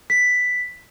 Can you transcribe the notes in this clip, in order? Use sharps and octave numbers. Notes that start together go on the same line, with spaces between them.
B6